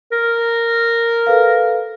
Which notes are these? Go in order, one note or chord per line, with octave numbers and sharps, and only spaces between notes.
A#4
A4 B4 F5